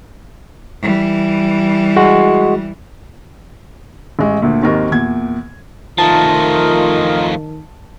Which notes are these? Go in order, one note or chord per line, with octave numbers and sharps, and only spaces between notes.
E3 G3
G#3 F#4
A1 G#3
D2 A#2
G#1 D#2 D#3 A#4
E2 A#2 G#6
D#3 F3 A3 F4 A#4 D#5 A5